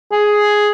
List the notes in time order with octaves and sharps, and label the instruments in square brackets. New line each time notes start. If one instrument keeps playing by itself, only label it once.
[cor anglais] G#4